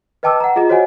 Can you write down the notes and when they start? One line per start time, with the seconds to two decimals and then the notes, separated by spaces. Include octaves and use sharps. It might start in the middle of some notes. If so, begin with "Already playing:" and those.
0.23 B4 D#5 G5 A5 D6 E6
0.40 F#5 A#5
0.56 F4 G#4 D#5 A#5
0.69 F#4 C5 C#5 D#5 F#5 G#5